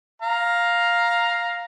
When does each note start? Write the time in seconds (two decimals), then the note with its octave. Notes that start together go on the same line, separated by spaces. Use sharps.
0.22 F5 A#5